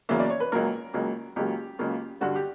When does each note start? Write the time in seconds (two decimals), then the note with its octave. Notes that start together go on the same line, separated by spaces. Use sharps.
0.09 E2 C#3 F#3 A#3 E5
0.20 D5
0.30 C#5
0.40 B4
0.52 C#2 C#3 F#3 A#3 A#4
0.94 C#2 C#3 F#3 A#3
1.36 C#2 C#3 F#3 A#3 G4
1.79 C#2 C#3 F#3 A#3
2.21 G2 D3 G3 F#4
2.36 G4